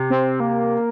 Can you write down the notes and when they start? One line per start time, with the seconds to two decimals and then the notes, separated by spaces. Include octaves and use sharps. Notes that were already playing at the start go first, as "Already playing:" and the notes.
Already playing: C3
0.10 C4
0.40 A#3